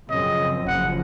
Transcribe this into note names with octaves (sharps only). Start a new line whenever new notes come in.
F#2 C#3 F3 C4 D#5
F#1 F#2 C#3 F3 F#5